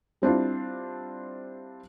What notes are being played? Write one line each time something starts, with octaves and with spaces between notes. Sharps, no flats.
G3 C4 D4 E4 F4